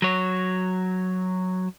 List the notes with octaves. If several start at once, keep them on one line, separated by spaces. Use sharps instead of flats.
F#3 C#5